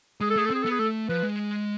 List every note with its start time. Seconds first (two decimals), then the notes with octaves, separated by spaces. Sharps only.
0.21 G#3 G#4
0.30 A4
0.36 A3 G#4
0.46 A4
0.50 C4 G#4
0.63 B3 A4
0.71 G#4
0.79 A3 A4
1.09 F3 B4
1.23 G#3